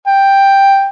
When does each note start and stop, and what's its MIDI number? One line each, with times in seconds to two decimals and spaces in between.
0.07 0.88 79